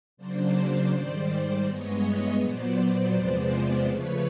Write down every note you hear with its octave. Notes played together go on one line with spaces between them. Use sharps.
C#3 F#3 A#3 D4 C5 D5
G#2 D#3 G3
G2 E3 G#3 B3 C#5 D#5
C#5 D#5
A#2 F#3 B3 C5 D5
E2 C3 F3 G#3 B3
C#3 F3 A3 B4 C#5